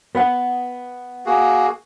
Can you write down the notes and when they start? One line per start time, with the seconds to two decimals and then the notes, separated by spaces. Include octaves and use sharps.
0.15 B3 B4 F#5
1.26 A#3 F#4 G#4